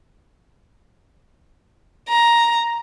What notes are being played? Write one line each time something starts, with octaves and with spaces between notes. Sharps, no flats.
A#5